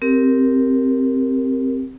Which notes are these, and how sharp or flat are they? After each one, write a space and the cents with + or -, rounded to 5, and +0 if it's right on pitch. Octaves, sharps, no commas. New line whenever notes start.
C4 +0 G4 +0 A#4 +0